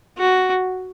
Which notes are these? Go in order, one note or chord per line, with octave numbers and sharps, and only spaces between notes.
F#4